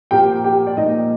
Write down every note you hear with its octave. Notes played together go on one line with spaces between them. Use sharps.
A#2 F3 A#3 G4 G5
G4 G5
D5
A#2 F3 A#3 D#4 D#5